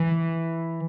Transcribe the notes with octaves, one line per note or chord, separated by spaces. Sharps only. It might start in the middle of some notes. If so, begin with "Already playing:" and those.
Already playing: E3